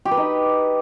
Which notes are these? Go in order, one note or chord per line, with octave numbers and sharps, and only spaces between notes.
G4
B4
D#4